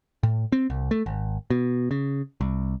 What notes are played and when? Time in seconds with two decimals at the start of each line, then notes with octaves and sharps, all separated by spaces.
0.23 A2
0.52 C4
0.70 C2
0.91 A3
1.06 G#1
1.50 B2
1.91 C#3
2.41 C2